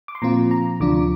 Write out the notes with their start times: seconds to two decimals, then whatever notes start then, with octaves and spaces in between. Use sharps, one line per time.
0.08 D6
0.15 C6
0.22 A#2 F3 C4 F4 A#5
0.51 A#5
0.80 D2 C3 F3 D4 F4 D6